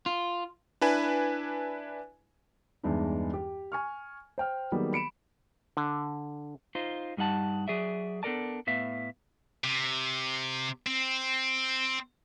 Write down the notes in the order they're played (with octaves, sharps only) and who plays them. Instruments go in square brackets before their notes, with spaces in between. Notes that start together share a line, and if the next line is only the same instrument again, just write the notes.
[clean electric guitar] F4
[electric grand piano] D4 E4 B4 G#5
[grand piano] E2 G2 E3 G#3 D4 D#4
G4
G#5 C#6 F6
C5 G5 F6
D#3 F#3 G3 A#3 B3 G#4
B5 C#7 D7 E7
[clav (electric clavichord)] D3
[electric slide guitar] D#4 F4 C5
G2 G3 D#4 F#5 A5
F#3 G#4 D5 E5
B3 D4 A4 A#4 D5 A5
A2 B3 E5 F5
[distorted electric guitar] C3
C4